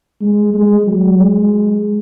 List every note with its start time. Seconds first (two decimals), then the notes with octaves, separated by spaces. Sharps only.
0.21 G#3
0.54 G#3
0.87 F#3
1.19 G#3